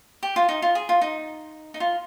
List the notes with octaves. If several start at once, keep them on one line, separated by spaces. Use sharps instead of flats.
G4
F4
D#4
F4
G#4
F4
D#4
D#4
F4